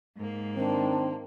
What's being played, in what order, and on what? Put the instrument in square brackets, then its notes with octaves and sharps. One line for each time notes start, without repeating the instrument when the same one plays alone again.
[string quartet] G#2 A#3
[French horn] D#3 [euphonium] C4 [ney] D4